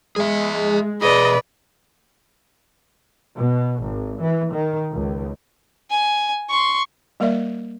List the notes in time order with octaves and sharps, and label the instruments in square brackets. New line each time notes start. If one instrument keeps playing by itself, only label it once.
[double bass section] G#3 [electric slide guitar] G#4 E5
[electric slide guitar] B2 G#4 [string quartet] B4 D5 [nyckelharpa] D#5
[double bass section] B2
G#1
E3
D#3
C#2
[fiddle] G#5
C6 C#6
[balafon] G3 A#3 A#4 D5 E5